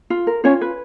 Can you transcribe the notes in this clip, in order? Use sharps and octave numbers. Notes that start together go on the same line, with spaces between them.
F4
A#4
C#4 F4 C#5
B4